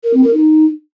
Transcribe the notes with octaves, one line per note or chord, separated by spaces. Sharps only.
A#4
C4
A#4
D#4